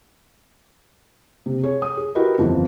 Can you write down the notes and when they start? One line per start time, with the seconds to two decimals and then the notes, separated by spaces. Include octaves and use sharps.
1.46 C3
1.63 G#4 C#5
1.82 D#6
1.97 G#4
2.15 E4 F#4 G4 A#4 B4 D#5
2.38 G1 F2 E3 F3